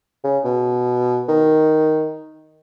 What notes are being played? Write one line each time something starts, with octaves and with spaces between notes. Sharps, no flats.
C#3
B2
D#3